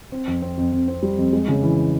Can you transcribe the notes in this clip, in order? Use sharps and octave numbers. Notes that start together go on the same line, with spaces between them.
C4
F2
C4
F2
F2
C4
G3
F2
G#3
C#3
E3